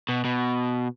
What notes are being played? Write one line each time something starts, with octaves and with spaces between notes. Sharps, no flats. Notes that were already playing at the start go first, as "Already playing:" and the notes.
B2
B2